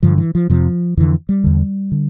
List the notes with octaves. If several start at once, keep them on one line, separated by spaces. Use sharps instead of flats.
G2 D3 F3
E3
F3
F2 C3 F3
F2 D3 E3
G3
E2 D3
D3